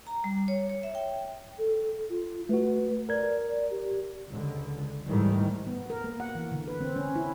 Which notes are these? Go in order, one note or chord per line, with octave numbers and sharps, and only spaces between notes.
A#5
G3
C#5
C#5
E5
G5
A4
F4
A3 F#4 B4
A#4 D5 G#6
D5
G4
C#2 D3
G#2 D#3 E3 G3 A3
B3
A#4
A#3
F#5
E3
D3
B4
C4
C#4
E4